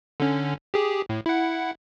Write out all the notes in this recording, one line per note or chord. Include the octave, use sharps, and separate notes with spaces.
D3 C#4
G4 G#4
A2
E4 F#5